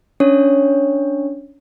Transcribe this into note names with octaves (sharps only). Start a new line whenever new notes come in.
C#4 D4 C#5